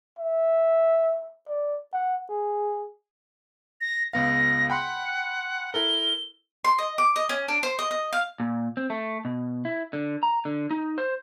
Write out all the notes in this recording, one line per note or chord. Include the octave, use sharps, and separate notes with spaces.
E5
D5
F#5
G#4
A#6
C#2 B3 F5 A#6
F#5 G5 B5 C6
E4 A4 A#4 G7
C6
D#5
D6
D#5
C#4
D4
C5
D#5
D#5
F5
A#2
C4
A3
B2
E4
D3
A#5
D3
D#4
C5